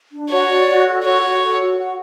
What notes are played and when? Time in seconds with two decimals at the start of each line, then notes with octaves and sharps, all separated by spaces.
0.12 D4
0.30 F#4 C#5
0.49 D5
0.68 F#4
0.86 A4
1.04 F#4 C#5
1.22 F#4
1.42 A4
1.60 F#4
1.78 F#5